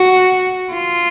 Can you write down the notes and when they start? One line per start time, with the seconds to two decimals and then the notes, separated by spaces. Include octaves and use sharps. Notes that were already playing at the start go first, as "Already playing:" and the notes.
Already playing: F#4
0.73 F4